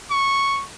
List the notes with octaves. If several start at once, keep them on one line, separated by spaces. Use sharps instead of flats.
C#6